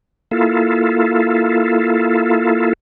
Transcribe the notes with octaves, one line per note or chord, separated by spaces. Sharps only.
A#3 E4 F4 A4